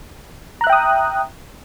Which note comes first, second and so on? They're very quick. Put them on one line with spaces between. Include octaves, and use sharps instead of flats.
A#5 F#6 E5 G5 D#6